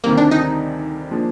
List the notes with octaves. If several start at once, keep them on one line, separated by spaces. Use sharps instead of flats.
D2 C3 D#3 G3 A#3 C4
D4
D#4
F3 A#3 D4 G#4